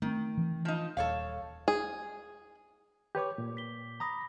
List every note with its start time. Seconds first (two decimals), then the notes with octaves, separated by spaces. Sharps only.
0.02 D#3 A3 B3 C4
0.37 E3
0.65 F3 D#4
0.97 D#1 A4 C#5 F5
1.68 G#4
3.15 G4 B4 C#5 D6 G6
3.38 A#2
3.57 B6 G7
4.00 A#5 B5 D#6 A#6